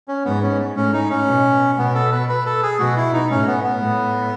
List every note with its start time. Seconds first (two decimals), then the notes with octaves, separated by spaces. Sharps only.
0.08 C#4
0.25 G#2 B3
0.43 C#4
0.76 A2 C#4
0.93 D#4
1.10 C#4
1.27 B2
1.78 B2 B3
1.95 A4
2.12 B4
2.29 B4
2.46 A4
2.63 G#4
2.79 B2 F#4
2.97 E4
3.13 D#4
3.30 A2 C#4
3.47 B3
3.64 B3
3.82 A2